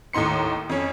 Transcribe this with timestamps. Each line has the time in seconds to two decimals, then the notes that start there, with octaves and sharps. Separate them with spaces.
0.13 D#2 A2 D#4 C6 C#7
0.69 F2 C#4